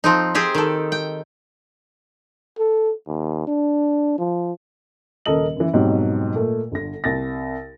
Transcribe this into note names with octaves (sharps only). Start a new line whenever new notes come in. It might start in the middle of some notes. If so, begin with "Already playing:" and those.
F3 C4 D#4
C4 G4 G#4 C5
D#3 A4
G5
A4
D#2
D4
F3
D#1 C#3 A4 A#4 D#5 F#7
F#2 E3
F2 G#2 B2 F#3 G3
A#2 A3
G1 D3 A#6
C2 A6 A#6